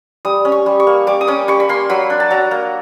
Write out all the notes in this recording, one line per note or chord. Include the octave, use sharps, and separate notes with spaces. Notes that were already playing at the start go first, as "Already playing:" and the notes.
G3 D#6
C#4
C#6
G3
C#6
A#3
G3 D6
D#6
C#4 D6
G3 C#6
B5
A#3 C6
F#3 B5
D4
A5
F#3 A#5
A#3